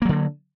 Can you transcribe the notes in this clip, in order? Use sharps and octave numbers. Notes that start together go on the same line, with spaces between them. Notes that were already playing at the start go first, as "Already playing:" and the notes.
D3 F#3 A#3